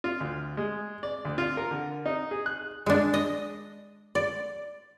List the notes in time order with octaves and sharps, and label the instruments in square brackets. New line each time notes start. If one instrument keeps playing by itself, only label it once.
[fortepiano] F4
D2
G#3
D5
D2
F4
A#4
D3
D#4
G#4
F#6
[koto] G#3 D4
D#5
D5